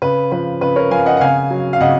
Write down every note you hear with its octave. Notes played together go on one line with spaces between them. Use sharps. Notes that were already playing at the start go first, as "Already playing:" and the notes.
C#3 B4
F3 B4
C#3 B4
A#4 C#5
F3 F5 G#5
D#5 F#5
F#5
C#3 F5 G#5
F#3
F5
C#3 D#5 F#5